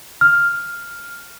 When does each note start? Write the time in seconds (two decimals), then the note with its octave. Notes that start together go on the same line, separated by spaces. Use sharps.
0.21 F6